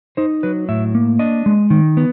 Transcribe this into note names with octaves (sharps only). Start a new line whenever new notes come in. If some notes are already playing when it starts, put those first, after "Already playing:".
D#4 C5
F#3 B4
A2 E5
A#3
D4 D#5
G#3
D#3
B3